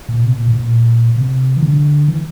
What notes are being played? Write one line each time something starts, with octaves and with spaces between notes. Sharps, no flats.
A#2
C3
A#2
A2
A#2
C3
E3
D3
E3